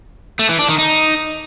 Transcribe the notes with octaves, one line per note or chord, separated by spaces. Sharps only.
A3
E3
D4
D#3
D#4